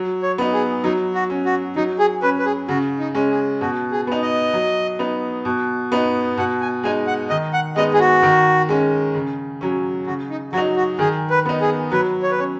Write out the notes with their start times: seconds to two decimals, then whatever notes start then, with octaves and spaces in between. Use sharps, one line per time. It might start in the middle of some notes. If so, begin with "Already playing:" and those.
Already playing: F#3
0.22 C#5
0.38 B3 D#4
0.53 G#4
0.84 F#3 D#4
1.14 F#4
1.30 C#4
1.46 F#4
1.76 F#3 D#4
1.99 G#4
2.22 C#4 B4
2.39 B4
2.46 G#4
2.68 C#3 F#4
2.99 D#4
3.15 G#3 C#4
3.30 G#4
3.61 B2 F#4
3.91 G#4
4.07 B3 D#4
4.23 D#5
4.54 F#3
4.99 B3 D#4
5.45 B2
5.92 B3 D#4
6.37 B2 F#5
6.61 G#5
6.83 G#3 D#4 G#5
7.07 F#5
7.30 D#3 D#5
7.53 F#5
7.76 G#3 B3 D#4 D#5
7.94 G#4
8.00 F#4
8.23 D#3
8.69 G#3 C#4
9.15 C#3
9.61 F#3 C#4
10.07 C#3 F#4
10.30 D#4
10.53 F#3 F#4
10.58 D#4
10.76 F#4
10.99 D#3 G#4
11.30 B4
11.46 B3 D#4
11.61 G#4
11.92 F#3 B4
12.23 C#5
12.31 B4
12.38 C#4 C#5